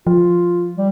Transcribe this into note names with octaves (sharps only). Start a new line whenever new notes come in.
F3 F4
G3